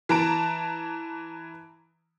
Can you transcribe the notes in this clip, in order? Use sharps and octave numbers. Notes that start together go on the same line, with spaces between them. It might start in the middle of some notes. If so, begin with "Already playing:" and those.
E3 A5 A#5 D7